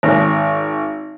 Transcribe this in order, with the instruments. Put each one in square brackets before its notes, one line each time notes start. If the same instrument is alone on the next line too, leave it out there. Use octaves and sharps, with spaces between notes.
[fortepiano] G#1